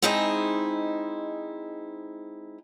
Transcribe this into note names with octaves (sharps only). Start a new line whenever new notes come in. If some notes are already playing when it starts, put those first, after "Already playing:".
G#3 C4 D#4 E4 G#4 D#5